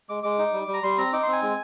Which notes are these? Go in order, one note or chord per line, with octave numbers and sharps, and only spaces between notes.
G#3 D6
G#3 D6
D#4
G3
G3
A#5
G3 C6
C4 A#5
D#4 D6
C6
C4 G#5
G#3